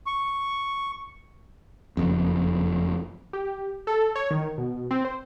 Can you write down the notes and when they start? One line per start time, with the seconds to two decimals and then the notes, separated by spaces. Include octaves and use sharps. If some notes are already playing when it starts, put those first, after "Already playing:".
0.07 C#6
1.97 F#1 F2
3.33 G4
3.87 A4
4.15 C#5
4.31 D#3
4.58 B2
4.91 C4
5.05 C5